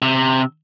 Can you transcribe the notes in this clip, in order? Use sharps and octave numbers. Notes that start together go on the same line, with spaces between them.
C3